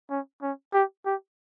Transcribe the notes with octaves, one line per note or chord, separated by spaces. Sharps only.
C#4
C#4
G4
G4